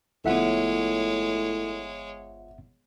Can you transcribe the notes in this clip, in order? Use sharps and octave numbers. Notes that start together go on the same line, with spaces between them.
G1 A2 F3 G#3 B3 C#5 E5 F#5